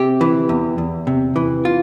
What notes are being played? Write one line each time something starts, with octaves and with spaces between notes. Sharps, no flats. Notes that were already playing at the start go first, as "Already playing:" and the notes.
Already playing: C3 G4
E3
E2
E2
C3
E3
F4